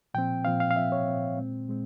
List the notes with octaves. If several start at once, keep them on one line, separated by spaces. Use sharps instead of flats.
A#2 F3 C4 G5
A#2 F3 C4 F5
F5
F5
A#2 F3 C4 E5
C#5
A#2 F3 C4
A#2 G#3 C4
A#2 G#3 C4